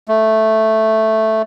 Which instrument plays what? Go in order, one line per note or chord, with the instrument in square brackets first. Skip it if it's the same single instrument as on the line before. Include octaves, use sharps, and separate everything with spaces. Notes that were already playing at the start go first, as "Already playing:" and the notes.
[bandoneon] A3